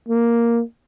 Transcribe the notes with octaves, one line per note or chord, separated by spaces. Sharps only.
A#3